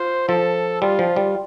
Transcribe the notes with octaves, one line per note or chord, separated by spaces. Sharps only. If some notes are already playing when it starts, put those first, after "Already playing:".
Already playing: F4 C5
F3 A4
G3 F4
F3
G3